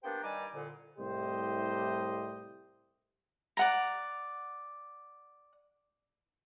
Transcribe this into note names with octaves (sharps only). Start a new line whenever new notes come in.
A#3 B3 D4 G4 C5 G5
G2 D#3 G3 G#5 A#5 D6
C2 F2 A#2 D3
C2 A2 G4 C5 D#5
D5 F#5 A#5